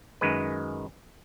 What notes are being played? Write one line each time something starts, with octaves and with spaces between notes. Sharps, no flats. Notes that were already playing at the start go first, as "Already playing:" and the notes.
F#2 D#3 G#3 B4